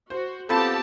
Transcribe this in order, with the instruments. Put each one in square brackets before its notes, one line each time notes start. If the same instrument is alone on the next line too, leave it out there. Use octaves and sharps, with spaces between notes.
[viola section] F#4 [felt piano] C5
[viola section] B3 G4 A5 [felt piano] C4 F4 B5 [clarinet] A4